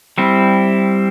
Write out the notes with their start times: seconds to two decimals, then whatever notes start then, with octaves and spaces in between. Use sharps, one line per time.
0.18 G3 C4 E4